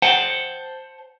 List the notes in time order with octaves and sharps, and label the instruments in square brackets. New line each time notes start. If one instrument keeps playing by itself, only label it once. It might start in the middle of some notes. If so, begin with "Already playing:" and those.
[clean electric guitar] C5 F#5 G5 A5